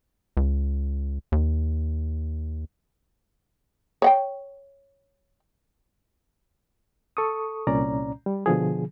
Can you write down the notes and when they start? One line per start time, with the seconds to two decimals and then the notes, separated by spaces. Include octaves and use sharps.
0.37 C#2
1.32 D#2
4.02 C#5 F#5 G5
7.17 A4 C#6 D#6
7.67 C2 A#2 C#4 D5 A#5
8.26 G3
8.46 B2 D3 F3 G#4